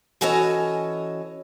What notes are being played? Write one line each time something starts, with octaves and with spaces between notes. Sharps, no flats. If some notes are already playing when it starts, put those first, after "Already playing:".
E3 C#4 F#4 A4 C#5 D#5